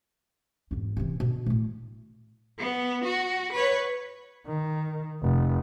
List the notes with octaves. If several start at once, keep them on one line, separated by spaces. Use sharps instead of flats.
G#1 E2
C3 E3
B2 D3
A2 A3
B3
F#4
B4 C#5
D#3
F1